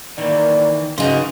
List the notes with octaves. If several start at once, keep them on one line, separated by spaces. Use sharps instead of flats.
D#3 E3 A#3 D5
C#3 D#4 F#4 B4 G#5 C6